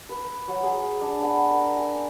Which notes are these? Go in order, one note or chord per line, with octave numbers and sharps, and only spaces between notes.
B4
F#3
G#4
D4
B3
A#4
G#5